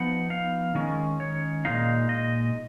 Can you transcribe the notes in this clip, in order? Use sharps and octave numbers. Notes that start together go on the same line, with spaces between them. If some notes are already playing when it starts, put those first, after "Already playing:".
Already playing: F3 B3 D#4 F#5
F5
D#3 G#3 C#4
C#5
A#2 F3 G#3 D#4 F5
D#5